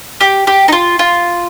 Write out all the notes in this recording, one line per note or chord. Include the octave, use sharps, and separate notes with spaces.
G4
G4
D#4
F4
F4